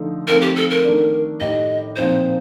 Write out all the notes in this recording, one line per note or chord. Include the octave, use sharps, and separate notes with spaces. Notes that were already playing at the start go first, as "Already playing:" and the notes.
Already playing: D3 F3 A3 D#4 A4
F3 A3 C4 D#4 A#4
G4
A4
A#4
D#3 A3 D4
A2 A3 D#4 G4 D#5
A#2 F3 C4 D#4 C5